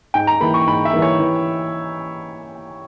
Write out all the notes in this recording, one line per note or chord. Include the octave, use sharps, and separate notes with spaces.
G#2 G5
A#5
E3 A#3 B5
C#6
G#2 B5
E5
E3 A#3
C#5
E3